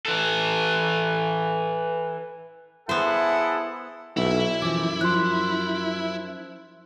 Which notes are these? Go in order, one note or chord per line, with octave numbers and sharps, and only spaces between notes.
E3 A4
B3 E4 G#4 A4 C5 F#5
B1 E4
F#2 E3 F3 D6
F3 C6 F#6